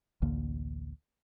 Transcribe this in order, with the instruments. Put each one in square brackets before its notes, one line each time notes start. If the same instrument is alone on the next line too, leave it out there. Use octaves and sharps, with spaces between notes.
[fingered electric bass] A1 D2 D3 A#3